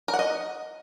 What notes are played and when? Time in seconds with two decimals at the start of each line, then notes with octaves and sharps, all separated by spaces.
0.08 A#4
0.14 F#5
0.19 D#5